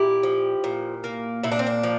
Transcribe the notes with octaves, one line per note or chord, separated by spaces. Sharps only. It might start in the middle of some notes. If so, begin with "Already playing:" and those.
Already playing: A#2 E4 G4
F3
A#2
A#3
A#2 E4
D4
C4
D4
F3